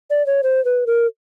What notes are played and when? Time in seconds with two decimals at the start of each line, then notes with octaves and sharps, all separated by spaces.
0.10 D5
0.26 C#5
0.43 C5
0.65 B4
0.87 A#4